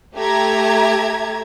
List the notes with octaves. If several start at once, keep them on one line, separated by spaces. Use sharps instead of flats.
A3 G4 E5 A#5 G#6